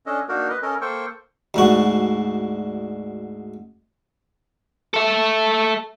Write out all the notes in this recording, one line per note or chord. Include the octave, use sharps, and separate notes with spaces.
C#4 D4 A4 D#5
A#3 D4 D#4 F#4 A#4
B4 D#5
C#4 A4 A#4 D#5
A#3 A4 C5 G5 C#6
D2 G#2 F#4
A4 E5